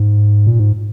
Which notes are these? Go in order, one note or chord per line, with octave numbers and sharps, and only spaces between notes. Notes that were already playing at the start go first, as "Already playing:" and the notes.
Already playing: G#2
A#2
G#2